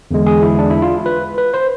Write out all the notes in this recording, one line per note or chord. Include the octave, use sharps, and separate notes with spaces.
E2 D3 G#3
G#4
E4
D4
E4
F4
B4
B4
C5